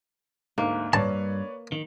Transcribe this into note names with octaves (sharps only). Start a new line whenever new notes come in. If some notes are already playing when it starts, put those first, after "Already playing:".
D2 G#2 A#3
G2 B4 C#5 D5 A5
D#3